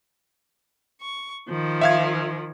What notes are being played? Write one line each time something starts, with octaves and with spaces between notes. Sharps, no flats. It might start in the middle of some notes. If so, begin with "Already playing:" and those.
C#6
D#3 F3
E5 F5 G#6